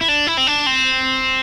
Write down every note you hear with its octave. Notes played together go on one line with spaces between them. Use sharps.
E4
D4
E4
C4
D4
C4